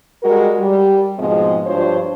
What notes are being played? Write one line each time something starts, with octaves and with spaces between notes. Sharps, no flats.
G3 G#3 F#4 A#4
G3
G#2 B2 F3 G#3 C4
G2 F3 D4 F4 C5 C#5